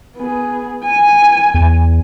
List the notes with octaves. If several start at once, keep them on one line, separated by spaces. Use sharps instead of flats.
B3 G#4
G#5
E2